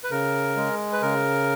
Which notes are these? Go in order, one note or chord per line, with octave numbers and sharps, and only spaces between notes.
B4
C#3 A#4
G#3
B4
C#3 A#4